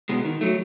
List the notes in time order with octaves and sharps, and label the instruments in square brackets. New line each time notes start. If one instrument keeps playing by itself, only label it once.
[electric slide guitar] B2 G#3
D#3
F#3 A3